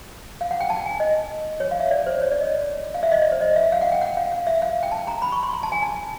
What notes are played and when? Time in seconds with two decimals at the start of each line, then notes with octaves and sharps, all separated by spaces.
0.41 F5
0.51 F#5
0.60 G5
0.70 A5
0.86 G#5
1.00 D#5
1.60 C#5
1.71 F5
1.80 E5
1.91 D5
2.07 C5
2.21 C#5
2.31 D5
2.41 D#5
2.94 F5
3.03 E5
3.12 D#5
3.21 D5
3.32 C5
3.41 D#5
3.56 E5
3.72 F5
3.81 F#5
3.92 G5
4.01 F#5
4.17 F5
4.32 F5
4.47 E5
4.62 F5
4.83 G5
4.92 A5
5.07 A#5
5.22 B5
5.32 C#6
5.43 C6
5.53 A#5
5.63 A5
5.72 G#5
5.82 A5